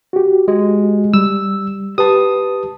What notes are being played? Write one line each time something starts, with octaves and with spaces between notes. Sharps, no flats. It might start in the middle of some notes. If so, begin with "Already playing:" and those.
F#4 G4
G#3
G3 E6
G4 B4 A5 D#6